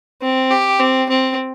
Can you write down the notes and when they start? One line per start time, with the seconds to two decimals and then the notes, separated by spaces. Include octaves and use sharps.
0.22 C4
0.51 G4
0.80 C4
1.09 C4